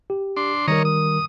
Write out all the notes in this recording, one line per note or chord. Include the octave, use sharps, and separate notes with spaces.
G4
D4 C6
D#3 G3 A#4 C#5 D#5 A#5
D#6